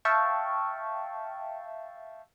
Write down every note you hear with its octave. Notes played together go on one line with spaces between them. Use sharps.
E5 F5 G5 A5 C#6